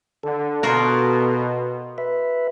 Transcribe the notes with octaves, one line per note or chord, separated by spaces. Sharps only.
D3 A4
B2 F4 F#4 A#4
B4 E5